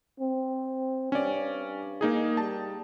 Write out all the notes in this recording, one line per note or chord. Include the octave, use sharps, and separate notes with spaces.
C4
G2 C#4 D5
A#3 D#4 G#4
G3 A5